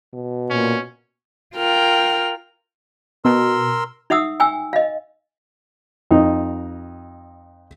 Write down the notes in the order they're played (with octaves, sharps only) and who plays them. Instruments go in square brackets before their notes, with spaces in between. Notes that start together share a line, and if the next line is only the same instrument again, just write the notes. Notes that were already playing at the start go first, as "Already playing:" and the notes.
[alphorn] B2
[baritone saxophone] A#2 [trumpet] C#4
[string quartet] F4 A#4 G5 F6
[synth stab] B2 [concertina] A#4 C6 E6
[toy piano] D#4 E5 F#5 D#6 E6
G5 G#5 E6
D#5 F5
[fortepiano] F2 D#4